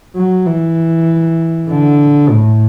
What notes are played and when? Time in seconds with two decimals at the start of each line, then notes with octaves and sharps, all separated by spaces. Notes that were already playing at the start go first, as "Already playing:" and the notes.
0.16 F#3
0.46 E3
1.70 D3
2.30 A2